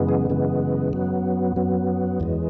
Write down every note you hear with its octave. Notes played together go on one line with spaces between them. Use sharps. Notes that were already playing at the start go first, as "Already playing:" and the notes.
Already playing: F#2 C#3 E3 G#3 B3
G#4
F#2 C#3 E3 G#3 B3
F#2 F#3 B3
F#2 F#3 B3
E2 E3 G#3